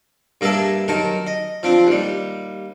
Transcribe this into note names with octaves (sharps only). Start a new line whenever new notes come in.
G2 A#3 G#4 D5 E5 A5
F#2 D#3 A#4 A5
D#5
F3 C4 D4
D#2 G3